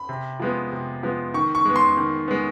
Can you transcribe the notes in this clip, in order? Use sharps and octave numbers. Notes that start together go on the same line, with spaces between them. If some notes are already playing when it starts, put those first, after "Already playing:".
Already playing: B5
C3
F3 G#3 B3
C3
F3 G#3 B3
D#3 C#6
C#6
G#3 B3
C6
D#3
G#3 B3